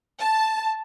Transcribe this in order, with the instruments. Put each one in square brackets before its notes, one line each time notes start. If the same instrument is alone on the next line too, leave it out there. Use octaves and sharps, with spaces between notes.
[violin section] A5